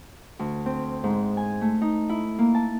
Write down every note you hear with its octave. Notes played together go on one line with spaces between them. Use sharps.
D2
C4
G#2
G#5
A3
D#4
E4
A#3
A5